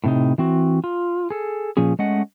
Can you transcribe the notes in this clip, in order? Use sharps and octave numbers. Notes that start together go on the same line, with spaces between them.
A2 C3 D#4
E3 C4 F#4
F4
G#4 A4
A#2 F3 C#4 G#4
G#3 A3 C#4 D#5 F#5